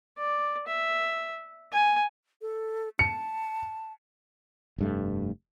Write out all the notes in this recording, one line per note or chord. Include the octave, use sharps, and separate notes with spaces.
D5
E5
G#5
A4
A5 C#7
F1 G2 A3